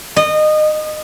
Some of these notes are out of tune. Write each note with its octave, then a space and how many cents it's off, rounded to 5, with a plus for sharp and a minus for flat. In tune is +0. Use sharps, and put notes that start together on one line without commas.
D#5 -25